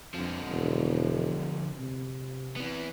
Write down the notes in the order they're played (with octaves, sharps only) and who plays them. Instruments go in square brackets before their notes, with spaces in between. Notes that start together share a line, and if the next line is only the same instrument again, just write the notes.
[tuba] F2 [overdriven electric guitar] D3 F3
[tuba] E1
C3
[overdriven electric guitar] E3 B3